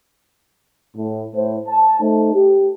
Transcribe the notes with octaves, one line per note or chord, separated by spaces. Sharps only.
A2
A2 C5
A5
A3 D#4 A4 C5
G4